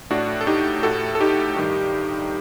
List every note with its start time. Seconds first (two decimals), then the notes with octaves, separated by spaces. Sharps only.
0.10 A2 D4 F#4
0.41 A4
0.47 D#4 G4
0.83 A2 F#4 A4
1.15 A4
1.20 D#4 G4
1.56 G2 D#3